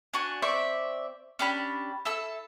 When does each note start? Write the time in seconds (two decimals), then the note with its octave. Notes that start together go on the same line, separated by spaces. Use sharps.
0.13 D4 F#4 G#5
0.42 C4 D5 E5 C#6
1.39 C#4 D4 G4 B5
2.05 E4 A4 E6